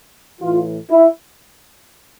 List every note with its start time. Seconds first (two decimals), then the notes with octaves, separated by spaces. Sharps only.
0.41 A2 E3 F4
0.91 E4